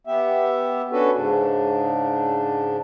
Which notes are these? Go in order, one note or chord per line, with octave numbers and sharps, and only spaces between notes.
B3 G4 E5
C#4 D4 F#4 A4 B4
G#2 C#3 D4